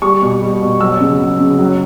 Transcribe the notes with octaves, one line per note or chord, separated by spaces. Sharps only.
G3 C#6
B2
G3
B2
F#3 E6
C#3
F#3
C#3
F#3